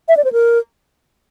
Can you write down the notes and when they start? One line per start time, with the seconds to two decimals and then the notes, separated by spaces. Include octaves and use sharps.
0.08 E5
0.17 D5
0.24 C5
0.32 A#4